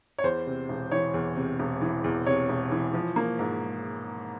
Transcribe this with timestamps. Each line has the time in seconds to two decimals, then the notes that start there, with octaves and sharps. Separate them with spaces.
0.18 C#5
0.24 E2 C5
0.47 C3
0.69 E1
0.92 E3 C#5
1.14 E2
1.36 C3
1.60 E1
1.82 E3
2.04 E2
2.26 C3 C#5
2.49 E1
2.72 E3
2.94 F3
3.16 A#3
3.39 G#2